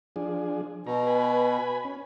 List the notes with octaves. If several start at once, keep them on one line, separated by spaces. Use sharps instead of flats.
F3 D4 G#4
B2 A#5
B4 G#5 B5
C#4